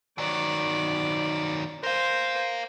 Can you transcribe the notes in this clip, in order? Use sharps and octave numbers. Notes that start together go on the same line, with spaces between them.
D#3 F#3 D5
A#4 C5 F5 G#5